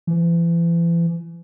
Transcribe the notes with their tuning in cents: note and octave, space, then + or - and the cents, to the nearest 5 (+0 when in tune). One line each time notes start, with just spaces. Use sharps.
E3 +40